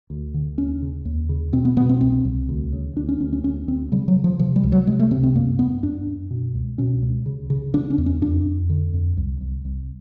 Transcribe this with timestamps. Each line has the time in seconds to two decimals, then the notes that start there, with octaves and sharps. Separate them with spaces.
0.10 D2
0.34 D3
0.58 D#2 C#4
0.82 C#3
1.05 D#2
1.29 C#3
1.53 B2 C4
1.65 B3
1.77 B2 B3
1.89 C4
2.01 C2 C4
2.25 C2
2.49 D2
2.73 C#3
2.96 D2 D4
3.09 C#4
3.20 D2 C#4
3.33 C#4
3.44 D2 C#4
3.68 D2 C4
3.92 C#3 G3
4.08 F#3
4.16 C#3
4.24 F3
4.39 C3 F3
4.56 G3
4.63 C#2
4.72 F#3
4.87 C3 G#3
4.99 A3
5.11 C3 C4
5.23 C4
5.35 F#2 A#3
5.59 F#2 B3
5.83 F#2 D4
6.07 F#2
6.31 B2
6.55 C#2
6.78 B2 C#4
7.02 C#2
7.26 C#3
7.50 C#3
7.74 C#3 D4
7.90 C#4
7.98 E2
8.06 C#4
8.22 F2 D4
8.45 F2
8.70 D3
8.94 F2
9.17 C2
9.41 C2
9.65 C2